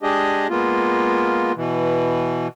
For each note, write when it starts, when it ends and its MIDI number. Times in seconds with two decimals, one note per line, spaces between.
0.03 0.47 56
0.03 0.47 62
0.03 0.47 67
0.03 0.47 68
0.03 0.47 75
0.50 1.52 56
0.50 1.52 58
0.50 1.52 59
0.50 1.52 65
1.56 2.48 47
1.56 2.48 52